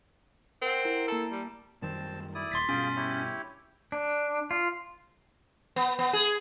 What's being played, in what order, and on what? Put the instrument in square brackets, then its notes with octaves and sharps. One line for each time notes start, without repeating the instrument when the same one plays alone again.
[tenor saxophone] C4 [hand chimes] A#4 F#5
[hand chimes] E4 A#4
[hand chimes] A#3 A5 A#5 [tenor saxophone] A4
[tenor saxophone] G3
[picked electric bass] F#2 D#3 G3 [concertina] C4 A5
[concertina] E4 D5 D#6
[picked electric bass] D#1 [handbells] C6 A6 B6
[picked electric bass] G2 B2 [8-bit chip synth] C#4 [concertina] F4 G#4 G5
[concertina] E4 G4 C#5
[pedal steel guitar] D4
F4
[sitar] B3
B3
G#4